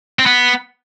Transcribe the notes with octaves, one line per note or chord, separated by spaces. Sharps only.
C4
B3